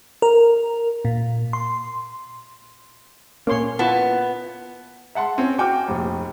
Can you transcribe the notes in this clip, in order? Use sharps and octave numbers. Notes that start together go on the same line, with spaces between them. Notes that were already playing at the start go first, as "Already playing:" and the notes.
A#4
A#2
C6
A#2 A#3 C#4 C#5 C6
B3 E4 F4 A5
E5 F#5 A5 C6
C4 C#4
F#4 G5 D6 F6
F1 A#1